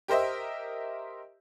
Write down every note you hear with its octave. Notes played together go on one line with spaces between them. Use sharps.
G4 A#4 C5 D#5 E5